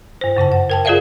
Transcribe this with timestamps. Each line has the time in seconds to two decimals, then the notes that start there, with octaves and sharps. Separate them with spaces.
0.21 G2 C5
0.37 F#2 C#3 C5 A5
0.52 F#5
0.70 A#4 G5 A5
0.85 F4 G#4 A#4 D5 E5 F5